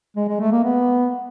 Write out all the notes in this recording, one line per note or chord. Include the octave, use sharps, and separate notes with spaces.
G#3
G#3
A3
A#3
B3